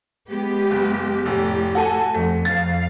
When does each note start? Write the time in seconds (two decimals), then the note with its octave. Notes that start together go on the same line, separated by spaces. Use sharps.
0.30 G#3 B3 G4
0.71 F#1
1.26 F1 A2 G4
1.75 F#4 A4 G#5
2.14 F2 A3
2.45 F2 F5 A6